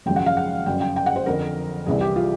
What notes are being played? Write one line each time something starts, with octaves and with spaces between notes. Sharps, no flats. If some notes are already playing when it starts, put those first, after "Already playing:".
G#1 F#2 C#3 F3 G5
F#5
F5
F#5
G1 F#2 C#3 G5
G5
G5
F#5
C5
F2 D3 F3 A#4
C2 C3 E3 G3 G#4
G4
F4